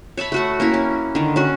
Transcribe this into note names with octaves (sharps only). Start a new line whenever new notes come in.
C#5 E5 A5 B5
A3 F#4 F#5
A#3 C#4 E4
C#4
D3 D#3
C#4 F#4